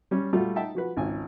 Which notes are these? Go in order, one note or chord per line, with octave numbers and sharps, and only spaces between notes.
G3 C#4
A#2 G3 A3 F4 F#4
D#4 E5 G5 A5
F3 F#4 B4
G#1 C#2 G#5